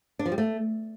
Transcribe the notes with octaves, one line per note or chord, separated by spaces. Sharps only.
D4
F3
G3
A3